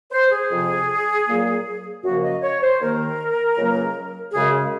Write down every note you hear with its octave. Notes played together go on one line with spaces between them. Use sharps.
C5
G#4
F2 C3 F3
A#2 F#3 A#3
F#2 C#3 F3 A#3 F#4
D#5
C#5
C5
D#2 D#3 A#3 A#4
C#2 C#3 F#3 A#3
F#2 C#3 G#3 G#4